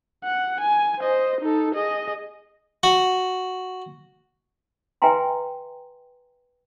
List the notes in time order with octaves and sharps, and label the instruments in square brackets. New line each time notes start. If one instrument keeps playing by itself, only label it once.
[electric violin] F#5
G#5
C5 D#5
D#4 A4
G#4 D#5
[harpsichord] F#4
[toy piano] B4 E5 G5 G#5 A#5 C6